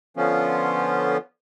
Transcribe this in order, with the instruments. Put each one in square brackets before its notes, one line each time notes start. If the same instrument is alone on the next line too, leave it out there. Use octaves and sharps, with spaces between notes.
[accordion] D3 F3 B3 C#4 F4